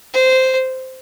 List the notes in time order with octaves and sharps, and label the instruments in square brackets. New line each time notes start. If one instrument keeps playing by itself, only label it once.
[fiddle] C5